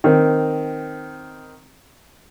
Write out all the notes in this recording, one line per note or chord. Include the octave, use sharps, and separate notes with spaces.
D#3 C4